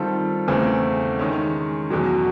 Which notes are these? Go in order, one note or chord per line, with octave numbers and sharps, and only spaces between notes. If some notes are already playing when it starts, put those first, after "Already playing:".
Already playing: D#3 G3 C4 F4 A4
E2 C#3 E3 A3 C4
D#3 G#3 C#4
E2 B2 F#3